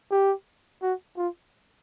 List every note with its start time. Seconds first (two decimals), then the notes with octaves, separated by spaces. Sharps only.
0.12 G4
0.83 F#4
1.17 F4